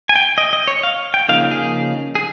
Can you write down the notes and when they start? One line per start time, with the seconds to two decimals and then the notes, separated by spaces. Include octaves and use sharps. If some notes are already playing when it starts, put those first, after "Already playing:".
0.09 G#5
0.16 G5
0.38 D#5
0.53 D#5
0.68 C#5
0.83 F5
1.14 G5
1.29 C#3 F3 A#3 D#4 F5
1.51 G#4
2.15 G#4